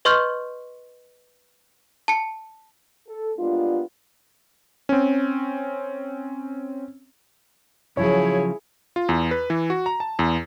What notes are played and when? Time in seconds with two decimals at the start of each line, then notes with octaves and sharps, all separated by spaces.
0.05 B4 D#5 C6 C#6 F6 G6
2.08 A5 C#7
3.08 A4
3.38 G3 G#3 A#3 B3 D4 F4
4.89 C4 C#4
7.97 C#3 F3 F#3 E4 G#4 C#5
8.96 F4
9.09 E2
9.31 B4
9.50 E3
9.70 F#4
9.86 A#5
10.00 A5
10.19 E2